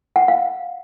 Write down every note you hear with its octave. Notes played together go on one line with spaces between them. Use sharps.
F#5
F5